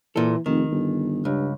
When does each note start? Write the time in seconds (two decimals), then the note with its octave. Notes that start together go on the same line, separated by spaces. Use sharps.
0.16 A#2 E3 A4
0.46 F1 D#3
0.71 G1
1.25 C#2 G2